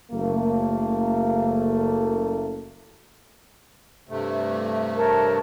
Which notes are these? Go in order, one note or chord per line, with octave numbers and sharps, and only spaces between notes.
F#1 A3 A#3
G2 C3 A3
A#4 C#5 A5